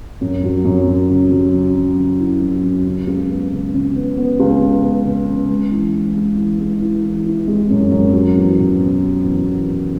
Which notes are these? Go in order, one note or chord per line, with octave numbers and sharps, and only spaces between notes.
F#2
F#3
F#2
F#3
C#3
F#3
C#3
F#3
C#3
E4
F#3
F#2
C#3
C#2
B3
C#3
C#3
B3
B3
C#2
C#3
B3
C#3
C#3
G#3
E3
E3
G#3
E3
G#3
E4
E3
E4
G#3
F#2
F#2
F#3
E2
B2
B2
F#3
E2
E2
E2